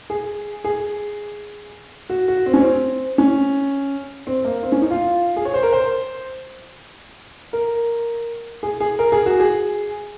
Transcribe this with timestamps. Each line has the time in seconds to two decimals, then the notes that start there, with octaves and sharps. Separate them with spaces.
0.10 G#4
0.64 G#4
2.10 F#4
2.28 F#4
2.46 C4
2.54 C#4
2.60 C4
3.18 C#4
4.27 C4
4.45 A#3
4.63 C4
4.72 C#4
4.82 D#4
4.91 F4
5.36 G#4
5.45 C#5
5.54 C5
5.63 A#4
5.73 C5
7.53 A#4
8.63 G#4
8.80 G#4
8.99 A#4
9.12 G#4
9.26 F#4
9.40 G#4